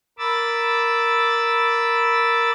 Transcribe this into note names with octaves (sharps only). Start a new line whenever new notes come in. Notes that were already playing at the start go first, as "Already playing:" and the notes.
A#4 B5 D6 E6 A6